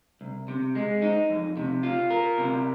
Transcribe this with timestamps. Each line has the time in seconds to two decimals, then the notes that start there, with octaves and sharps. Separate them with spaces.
0.21 C2
0.48 C3
0.75 G#3
1.02 D#4
1.30 F2
1.57 C3
1.83 F4
2.10 A#4
2.38 C3